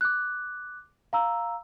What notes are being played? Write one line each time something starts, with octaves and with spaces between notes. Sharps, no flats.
D6 F#6
F5 A#5 E6